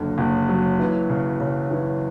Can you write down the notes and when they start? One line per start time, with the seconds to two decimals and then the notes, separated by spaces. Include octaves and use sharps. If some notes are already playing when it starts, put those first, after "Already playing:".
Already playing: F#1 F#2 D3
0.18 F#1
0.49 F#3
0.79 E3
1.09 C#3
1.40 C#3
1.71 E3